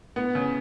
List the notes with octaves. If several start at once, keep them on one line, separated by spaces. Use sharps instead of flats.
B3
C#3